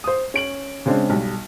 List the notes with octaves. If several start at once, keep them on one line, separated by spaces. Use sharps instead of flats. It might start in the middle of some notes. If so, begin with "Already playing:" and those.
C5 D#6
C#4 D7 F#7
C#3 G#3 C4 D4
B1 G3